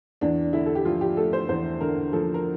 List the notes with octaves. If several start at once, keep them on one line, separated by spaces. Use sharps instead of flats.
E2 D4
D3 E4
A4
G4
F3 F4
G4
A3 A4
C5
E2 C5
D3 A#4
F3 A4
A#4